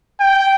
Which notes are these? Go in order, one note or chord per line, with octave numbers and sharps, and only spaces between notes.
G5